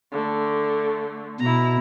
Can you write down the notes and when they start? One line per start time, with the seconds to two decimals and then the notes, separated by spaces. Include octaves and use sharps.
0.11 D3 A3
1.40 B2 E4 A#5